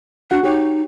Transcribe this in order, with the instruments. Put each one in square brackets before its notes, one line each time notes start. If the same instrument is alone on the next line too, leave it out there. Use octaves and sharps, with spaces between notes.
[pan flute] D4 [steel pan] F#4 F#5
[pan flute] D#4 [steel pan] G4 C#5